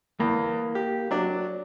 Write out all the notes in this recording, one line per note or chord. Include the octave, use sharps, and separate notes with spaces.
E2 A#3
G4
F#3 D4